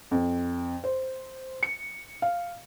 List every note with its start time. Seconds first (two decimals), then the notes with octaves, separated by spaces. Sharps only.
0.11 F2
0.84 C5
1.63 C#7
2.22 F5